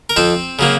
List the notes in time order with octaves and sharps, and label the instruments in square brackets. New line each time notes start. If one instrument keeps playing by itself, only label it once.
[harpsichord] A#4
F2 C4 C5
C#3 F#3 A#3